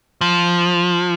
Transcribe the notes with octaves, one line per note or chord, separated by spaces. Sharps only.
F3